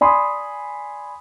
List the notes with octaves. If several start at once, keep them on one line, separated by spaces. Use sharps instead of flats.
D5 G#5 B5 C6 D#6